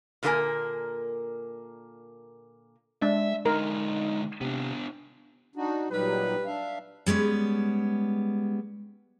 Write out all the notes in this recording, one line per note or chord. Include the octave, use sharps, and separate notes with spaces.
A#2 D3 F#3 A#3 A#4 G#5
G#3 D4 E5
D3 G#3 D#4 A#4
C3 B3 D4
D4 D#4 F#4
A#2 F#3 G3 D#4 G4 B4
D4 E5 F5
G3 G#3 B3 C#4